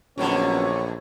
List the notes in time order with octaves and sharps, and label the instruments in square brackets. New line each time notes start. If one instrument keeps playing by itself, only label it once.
[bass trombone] A#1 [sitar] F2 B2 D3 [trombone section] F#3 B3 C#4 [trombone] C#5